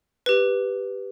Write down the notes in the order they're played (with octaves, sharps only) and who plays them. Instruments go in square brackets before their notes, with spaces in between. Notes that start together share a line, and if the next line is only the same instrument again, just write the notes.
[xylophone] G4 B4